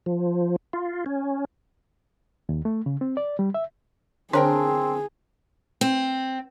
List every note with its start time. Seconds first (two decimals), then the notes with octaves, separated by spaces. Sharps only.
0.06 F3
0.73 F4
1.06 C#4
2.49 D#2
2.65 A3
2.86 C#3
3.01 C4
3.17 D5
3.39 G3
3.54 E5
4.33 D3 C4 D4 G#4 A#4 C5 C#5 G5
5.81 C4